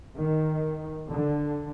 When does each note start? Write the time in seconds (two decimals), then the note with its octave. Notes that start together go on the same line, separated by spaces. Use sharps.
0.18 D#3
1.08 D3